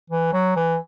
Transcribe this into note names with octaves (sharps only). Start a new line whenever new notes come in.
E3
F#3
E3